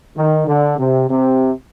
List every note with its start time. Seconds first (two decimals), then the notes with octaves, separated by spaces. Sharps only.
0.17 D#3
0.47 D3
0.79 C3
1.09 C3